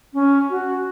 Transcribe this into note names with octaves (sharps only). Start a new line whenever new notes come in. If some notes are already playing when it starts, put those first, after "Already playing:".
C#4
F#4